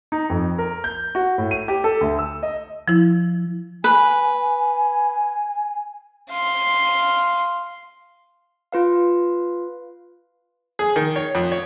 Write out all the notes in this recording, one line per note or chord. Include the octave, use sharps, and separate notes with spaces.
D#4
F2
A#4
G6
F#4
A2
D#7
G4
A4
D2
E6
D#5
F3 E4
B4 G#5
F5 C6
F4 B4 F5
G#4
D#3
C#5
F2
C#5